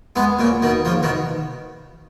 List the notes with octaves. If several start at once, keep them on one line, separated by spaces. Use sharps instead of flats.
G#3 B3
A#2 C#3
B2 D#3
C#3 F3
B2 D#3